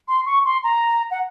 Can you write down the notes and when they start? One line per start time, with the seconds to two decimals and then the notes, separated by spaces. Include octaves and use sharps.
0.08 C6
0.26 C#6
0.45 C6
0.64 A#5
1.11 F#5